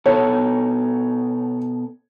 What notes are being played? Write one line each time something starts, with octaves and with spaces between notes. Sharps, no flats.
B2 B3 A4 C#5